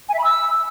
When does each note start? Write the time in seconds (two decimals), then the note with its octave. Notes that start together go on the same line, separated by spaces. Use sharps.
0.08 G#5
0.13 E5
0.19 B5
0.24 E6